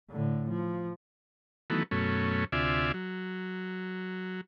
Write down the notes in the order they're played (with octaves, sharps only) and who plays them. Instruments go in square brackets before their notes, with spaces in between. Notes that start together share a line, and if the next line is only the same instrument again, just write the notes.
[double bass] A2 D3
F3
[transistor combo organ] D#3 E3 F#3 A3 B3
F#2 B2 A3 C#4
D2 C3 F4 D5 E5 G#5
F#3